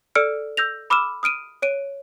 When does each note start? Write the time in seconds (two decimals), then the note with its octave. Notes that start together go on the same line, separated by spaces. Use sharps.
0.15 A4 D5 E6 F6 C#7 D7
0.57 E6 G6 A#6 F7
0.90 B5 D6 E6 F6 E7
1.23 D#6 F6 D7 D#7
1.62 C#5 D7 D#7